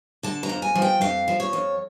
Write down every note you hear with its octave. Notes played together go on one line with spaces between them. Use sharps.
D3 A5
A#5
F2
G#5
F3
G5
F2 F5
F3
C#5
F2